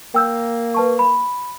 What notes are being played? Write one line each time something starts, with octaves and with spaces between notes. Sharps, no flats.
A#3 G5 E6 G6
B4 A5 C#6
B5